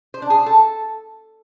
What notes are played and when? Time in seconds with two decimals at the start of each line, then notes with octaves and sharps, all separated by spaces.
0.14 C5
0.22 D4
0.30 G#4
0.38 C5
0.46 A4